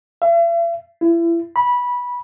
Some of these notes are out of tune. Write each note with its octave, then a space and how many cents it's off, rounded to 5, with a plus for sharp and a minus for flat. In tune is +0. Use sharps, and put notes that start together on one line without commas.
E5 +45
E4 +30
B5 -15